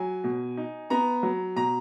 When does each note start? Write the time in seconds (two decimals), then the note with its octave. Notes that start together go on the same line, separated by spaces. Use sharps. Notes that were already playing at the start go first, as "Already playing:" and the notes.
Already playing: F#3 G#5
0.24 B2
0.57 D#4
0.90 B3 A#5
1.23 F#3
1.56 B2 A#5